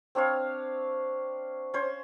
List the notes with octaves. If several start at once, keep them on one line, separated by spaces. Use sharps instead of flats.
C4 D4 C#5 F5
C#4 C5